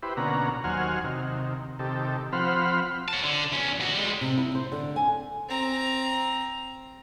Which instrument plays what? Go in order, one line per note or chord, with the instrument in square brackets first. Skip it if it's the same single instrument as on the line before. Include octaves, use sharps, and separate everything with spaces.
[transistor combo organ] E4 G4 B4 C5
B2 D3 A#3 C#4 F#5 A#5
D#2 F#3 C5 F#5 G#5 F6
C3 D#3
C3 D#3 G4 A4
F3 C4 C5 F#5 B5 F6
[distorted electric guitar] C#5 A5
D3
E2 C#4
D2 F#4
G3 G#3
[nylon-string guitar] C3
E4
C5
D3
G#5
[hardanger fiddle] C4 A#5